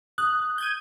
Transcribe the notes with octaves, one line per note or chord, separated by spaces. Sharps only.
D#6 F#6
G6 G#6 D#7